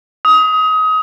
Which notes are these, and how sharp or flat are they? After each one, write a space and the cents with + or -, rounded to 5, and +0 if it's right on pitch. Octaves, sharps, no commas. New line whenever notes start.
D#6 +25